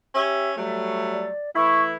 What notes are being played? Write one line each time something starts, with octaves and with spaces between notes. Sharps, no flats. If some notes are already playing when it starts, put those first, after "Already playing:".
C#4 G4 E5
F#3 G3 A3
D5
E3 A3 E4 C#6